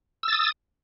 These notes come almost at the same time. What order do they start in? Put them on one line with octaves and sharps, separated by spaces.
E6 A6 D#6